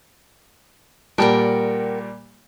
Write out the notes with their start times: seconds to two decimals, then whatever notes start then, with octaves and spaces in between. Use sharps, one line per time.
1.18 A#2 G3 A#4 F#5 G5 A5